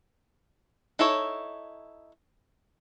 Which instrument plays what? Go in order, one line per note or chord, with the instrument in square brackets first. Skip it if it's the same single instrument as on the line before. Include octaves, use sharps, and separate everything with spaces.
[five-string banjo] D#4 E4 A4 C#5